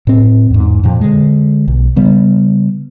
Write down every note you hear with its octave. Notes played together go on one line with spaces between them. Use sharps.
A2 C4
E2 G#2
F2 A#2 F3
D3 G#3
B1
C#3 G3 B3